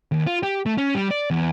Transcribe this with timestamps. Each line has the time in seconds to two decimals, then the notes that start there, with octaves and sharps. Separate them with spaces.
0.12 D#2
0.27 F4
0.43 G4
0.66 A3
0.78 C#4
0.95 G3
1.11 D5
1.31 E2